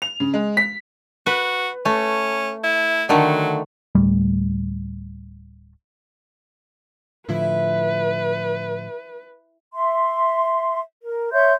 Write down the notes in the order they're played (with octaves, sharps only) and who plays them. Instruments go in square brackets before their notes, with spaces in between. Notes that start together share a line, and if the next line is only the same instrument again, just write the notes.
[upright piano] F7
C#3
G#3
B6
[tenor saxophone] F#4 [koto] B4
[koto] A3 [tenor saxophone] C#4
[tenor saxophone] E4
[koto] D3 D#3 A3 [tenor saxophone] F#3
[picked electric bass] D1 G3 A3
[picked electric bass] A2 D3 F3 [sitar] E4 [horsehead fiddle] B4
[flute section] E5 C6
A#4
C#5 E5 C6 G6